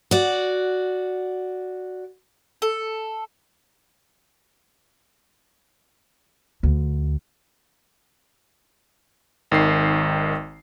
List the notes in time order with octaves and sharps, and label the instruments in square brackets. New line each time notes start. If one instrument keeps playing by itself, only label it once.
[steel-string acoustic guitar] F#4 D5
[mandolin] A4
[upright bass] D2
[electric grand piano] G#1 D#3 C7